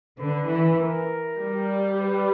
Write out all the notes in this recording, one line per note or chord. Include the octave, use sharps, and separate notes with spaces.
D3 B4
E3
A#4
G3
B4